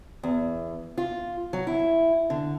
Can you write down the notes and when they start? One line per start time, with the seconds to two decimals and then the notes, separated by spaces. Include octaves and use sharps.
0.23 E2
0.98 F4
1.53 F#3
1.67 E4
2.30 D3